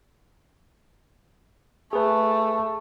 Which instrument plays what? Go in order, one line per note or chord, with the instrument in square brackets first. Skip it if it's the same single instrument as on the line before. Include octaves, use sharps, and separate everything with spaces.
[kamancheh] A3 [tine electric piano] G#4 B4